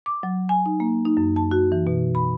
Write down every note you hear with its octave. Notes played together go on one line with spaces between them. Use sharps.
D6
F#3
G#5
D#4
A#3
D#4
F#2
A5
F#4
E3
B2
B5